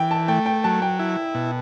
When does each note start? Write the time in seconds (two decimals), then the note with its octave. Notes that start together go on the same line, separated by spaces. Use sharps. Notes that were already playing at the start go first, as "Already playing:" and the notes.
Already playing: E3 G5
0.11 A5
0.28 A3 G5
0.46 G5
0.64 F#3 A5
0.82 G5
0.99 E4
1.35 B2